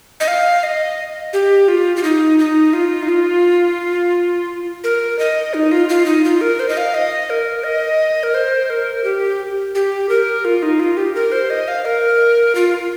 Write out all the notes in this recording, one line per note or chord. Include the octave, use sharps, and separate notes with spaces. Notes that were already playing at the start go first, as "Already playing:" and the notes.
D#5
F5
D#5
G4
F4
F4
D#4
D#4
F4
D#4
F4
A#4
D#5
D#4
F4
F4
D#4
F4
A#4
C5
D#5
F5
D#5
A#4
D#5
A#4
C5
A#4
G4
G4
A#4
F4
D#4
F4
G4
A#4
C5
D#5
F5
A#4
F4